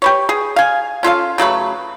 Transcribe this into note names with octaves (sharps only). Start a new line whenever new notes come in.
G4 B4 C#5
G#4
F5 G#5
C#4 F4 A4 F5
C#3 F#3 A3 B4